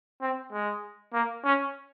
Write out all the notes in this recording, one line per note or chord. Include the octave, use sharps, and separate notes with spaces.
C4
G#3
A#3
C#4